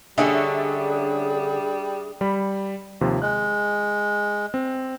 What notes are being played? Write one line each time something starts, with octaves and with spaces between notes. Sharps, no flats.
D3 G3 C#4 D4 G#4 A4 D#5 E5
G3 B5
D#2 C3 F3
G#3 F#6
C4